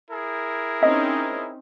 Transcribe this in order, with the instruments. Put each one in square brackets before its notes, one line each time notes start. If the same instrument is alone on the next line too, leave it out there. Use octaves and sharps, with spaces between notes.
[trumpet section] E4 G#4 A#4
[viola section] C4 C#4 D#4 [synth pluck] D#5